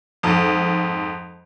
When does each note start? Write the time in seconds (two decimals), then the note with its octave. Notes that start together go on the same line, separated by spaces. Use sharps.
0.23 F2 G#2